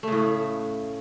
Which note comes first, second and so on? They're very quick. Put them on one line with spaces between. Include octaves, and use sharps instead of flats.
A3 C#3 A2